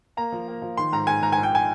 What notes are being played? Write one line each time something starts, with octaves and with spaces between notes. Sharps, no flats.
A#3 A#5
F3
A#3
F3
D#3 C6
G#2 A#5
G#2 G#5
G#2 A#5
G#5
A#1
G5
G#5